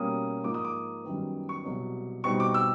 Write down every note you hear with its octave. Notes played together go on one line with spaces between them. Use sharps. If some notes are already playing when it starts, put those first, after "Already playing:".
Already playing: B2 G3 A#3 C#4 D#6
G#2 F3 A#3 D6
D#6
D6
F#2 D#3 G3 B3
C#6
C2 B2 F#3
B2 G3 C4 D#4 C#6
D6
E6